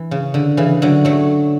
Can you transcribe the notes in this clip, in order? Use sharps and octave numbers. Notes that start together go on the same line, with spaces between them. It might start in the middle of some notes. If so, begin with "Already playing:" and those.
Already playing: E3
C#3
D3
C#3 E3
D3 F#3
F#3 A3